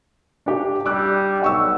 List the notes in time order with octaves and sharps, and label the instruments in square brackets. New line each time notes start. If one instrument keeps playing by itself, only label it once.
[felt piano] D4 G4
[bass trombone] G3 [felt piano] D6 E6 F#6
[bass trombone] B1 [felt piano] F#5 C#6 E6